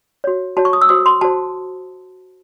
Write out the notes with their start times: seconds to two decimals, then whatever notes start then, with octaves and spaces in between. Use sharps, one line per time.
0.24 F#4 C#5
0.57 F#4 C#5 A5
0.65 C#6
0.73 D#6
0.81 E6
0.89 F#4 C5 D#6
1.06 C6
1.21 F#4 C5 A5